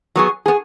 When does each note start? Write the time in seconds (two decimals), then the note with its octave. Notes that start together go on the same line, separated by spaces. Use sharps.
0.16 F#3 B3 G#4
0.46 B3 G#4